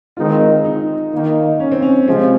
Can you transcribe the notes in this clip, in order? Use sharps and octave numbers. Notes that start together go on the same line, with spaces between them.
D#3 G#3 C4 D#4 F4
D#4
D#3 A#3 D#4
C#4
C4
C#4
C3 F3 G#3 C4